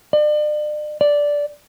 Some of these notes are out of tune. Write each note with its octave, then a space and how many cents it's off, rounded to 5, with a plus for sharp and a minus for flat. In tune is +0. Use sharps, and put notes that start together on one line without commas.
D5 +40
D5 -10